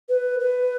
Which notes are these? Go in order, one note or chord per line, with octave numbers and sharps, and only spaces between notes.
B4
B4